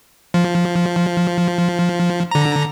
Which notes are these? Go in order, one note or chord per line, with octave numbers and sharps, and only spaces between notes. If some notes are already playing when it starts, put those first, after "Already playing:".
F3
D3 A#5